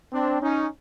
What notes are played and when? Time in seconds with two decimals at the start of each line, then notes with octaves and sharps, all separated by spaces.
0.12 C4 D4
0.41 C#4 D#4